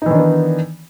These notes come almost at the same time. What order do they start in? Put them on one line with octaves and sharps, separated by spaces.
D#4 E3 D#3 D4 B3